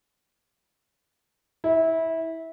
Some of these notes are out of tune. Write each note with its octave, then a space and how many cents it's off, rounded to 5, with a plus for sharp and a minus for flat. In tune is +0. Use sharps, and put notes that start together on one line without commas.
E4 -20